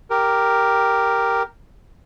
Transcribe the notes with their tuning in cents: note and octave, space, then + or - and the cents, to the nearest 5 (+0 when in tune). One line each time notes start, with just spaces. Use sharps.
G4 +0 A#4 +0